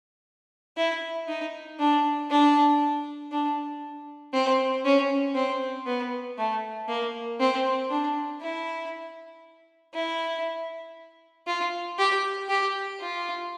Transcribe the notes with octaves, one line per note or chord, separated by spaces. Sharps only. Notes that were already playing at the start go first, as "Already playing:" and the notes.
E4
D#4
D4
D4
D4
C4
C#4
C4
B3
A3
A#3
C4
D4
E4
E4
F4
G4
G4
F4